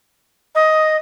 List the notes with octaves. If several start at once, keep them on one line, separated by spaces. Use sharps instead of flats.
D#5